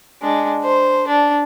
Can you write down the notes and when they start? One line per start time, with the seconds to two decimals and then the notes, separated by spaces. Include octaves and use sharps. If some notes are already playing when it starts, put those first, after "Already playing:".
0.22 G#3 D4
0.64 C5
1.08 D4